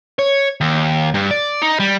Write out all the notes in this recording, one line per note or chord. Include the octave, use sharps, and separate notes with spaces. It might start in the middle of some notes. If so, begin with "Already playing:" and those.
C#5
D#2
G2
D5
D#4
G3